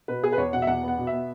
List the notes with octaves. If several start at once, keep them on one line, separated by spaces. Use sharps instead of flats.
B2 B4
B3 G#4
B4
E2 C#5
B2 F#5
E5
E2 F#5
B3 F#5
B2
B3 E5